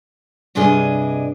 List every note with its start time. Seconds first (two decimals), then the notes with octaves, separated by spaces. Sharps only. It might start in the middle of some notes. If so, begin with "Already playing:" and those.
0.55 G2 C3 D4 G#4 D#5